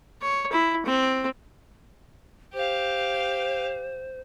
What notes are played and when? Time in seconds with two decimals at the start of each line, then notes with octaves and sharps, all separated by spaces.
0.22 C#5
0.52 E4
0.86 C4
2.54 G4 C5 F5